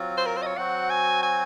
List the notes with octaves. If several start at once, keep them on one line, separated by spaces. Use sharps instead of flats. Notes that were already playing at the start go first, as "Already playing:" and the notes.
Already playing: F#3 C4 F4
C5
A#4
C5
D#5
C#5
F#3 C4 F#4 C5 F#5
G#5
G#5